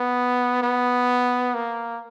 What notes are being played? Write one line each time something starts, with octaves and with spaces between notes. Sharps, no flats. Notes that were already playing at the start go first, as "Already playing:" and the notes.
Already playing: B3
B3
A#3